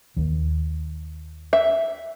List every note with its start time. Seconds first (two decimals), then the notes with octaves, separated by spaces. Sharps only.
0.17 D#2 D#3
1.53 E5